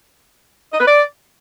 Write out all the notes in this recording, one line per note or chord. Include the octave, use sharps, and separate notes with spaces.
D#5
B4
D5